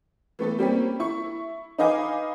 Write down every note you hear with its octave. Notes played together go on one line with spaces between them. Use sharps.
E3 A3 B3 A4
G3 A#3 C4 C#4
E4 C#6
D#4 B4 D#5 F5 G#5 D6